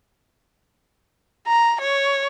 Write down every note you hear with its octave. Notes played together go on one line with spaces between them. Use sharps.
A#5
C#5